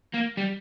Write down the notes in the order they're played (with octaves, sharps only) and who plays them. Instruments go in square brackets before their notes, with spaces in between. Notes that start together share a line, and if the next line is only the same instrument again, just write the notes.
[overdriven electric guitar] A#3
G3